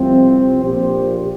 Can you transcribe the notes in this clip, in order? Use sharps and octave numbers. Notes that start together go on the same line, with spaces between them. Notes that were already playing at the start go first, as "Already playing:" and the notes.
Already playing: C2 C3 F3 C4
A#1 A#2 F3 G4 C5